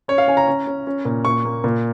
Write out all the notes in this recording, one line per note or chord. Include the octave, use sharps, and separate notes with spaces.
C#4 C#5
F5
C#4 G#5
A#5
C#4
C#4
C#4
A#2
A#2 C#6
A#3
A#2